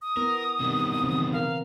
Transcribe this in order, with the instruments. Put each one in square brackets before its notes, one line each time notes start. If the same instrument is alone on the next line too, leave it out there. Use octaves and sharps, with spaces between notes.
[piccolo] D#6
[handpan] B3 E4 [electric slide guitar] A#4
[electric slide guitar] B2 D#3 G3 [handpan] C4 A#4
[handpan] C#3 E3 C4
[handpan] B3 A#4 [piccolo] F5